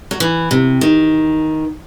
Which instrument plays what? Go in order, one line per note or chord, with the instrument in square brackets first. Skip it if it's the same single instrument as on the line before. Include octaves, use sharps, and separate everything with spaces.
[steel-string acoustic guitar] F#3
E3
C3
D#3